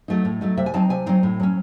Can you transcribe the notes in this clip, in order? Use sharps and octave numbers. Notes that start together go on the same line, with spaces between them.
F#3 A3 D#4
A2
F#3 A3 D#4
C3 E5
G#5
F#3 C4 D#4 A5
C3 G#5
F#3 C4 D#4
A2
F#3 C#4